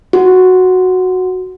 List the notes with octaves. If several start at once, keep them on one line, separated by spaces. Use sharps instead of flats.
F#4